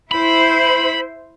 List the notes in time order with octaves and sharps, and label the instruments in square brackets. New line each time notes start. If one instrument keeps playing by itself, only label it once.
[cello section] E4 C5 [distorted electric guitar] B5